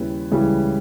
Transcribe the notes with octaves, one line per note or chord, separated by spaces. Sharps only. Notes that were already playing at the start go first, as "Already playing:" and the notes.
Already playing: D#2 C#3 G3 C#4 E4 B4
C#2 C#3 E3 G3 C#4